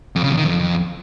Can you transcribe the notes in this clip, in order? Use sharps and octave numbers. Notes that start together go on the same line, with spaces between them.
F2
C#3
E2
D#3
F2